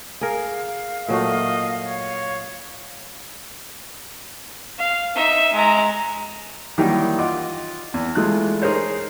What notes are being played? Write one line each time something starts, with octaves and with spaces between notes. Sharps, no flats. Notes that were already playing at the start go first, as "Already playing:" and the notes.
G#4 A#4 F5
A#2 F#3 A3 D#5
C#5
F5
D#4 E5
G#3 A#5
D#3 E3 F#3 G3 A#3 D#4
F4 D#5 F#5 D6
E2
E3 G#3 A3 F4 F#6
D#4 G#4 A#4 C5 C#5